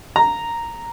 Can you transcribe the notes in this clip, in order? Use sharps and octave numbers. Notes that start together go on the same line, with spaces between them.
A#5